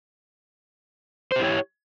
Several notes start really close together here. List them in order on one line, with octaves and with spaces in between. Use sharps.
C5 G4 E4 C#5